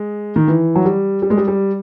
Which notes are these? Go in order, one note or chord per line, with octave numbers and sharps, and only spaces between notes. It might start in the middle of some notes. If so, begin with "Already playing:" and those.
Already playing: G#3
D#3
E3
F#3
G3
G3
G#3
G3
G3